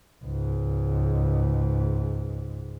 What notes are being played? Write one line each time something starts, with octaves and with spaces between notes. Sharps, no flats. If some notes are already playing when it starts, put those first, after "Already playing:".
C#2 G#2